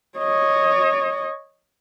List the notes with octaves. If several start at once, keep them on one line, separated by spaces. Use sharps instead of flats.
C#5 D#5